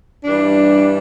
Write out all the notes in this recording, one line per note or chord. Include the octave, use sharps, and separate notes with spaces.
G2 E3 G3 D4